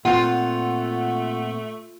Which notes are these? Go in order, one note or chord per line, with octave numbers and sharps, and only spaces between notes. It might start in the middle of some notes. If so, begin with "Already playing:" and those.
A#2 A3 C4 F4 F#5